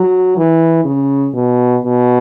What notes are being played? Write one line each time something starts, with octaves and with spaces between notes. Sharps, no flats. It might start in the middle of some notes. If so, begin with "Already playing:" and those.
Already playing: F#3
E3
C#3
B2
B2